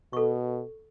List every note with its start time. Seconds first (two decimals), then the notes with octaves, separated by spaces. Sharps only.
0.13 B2 A4 C#6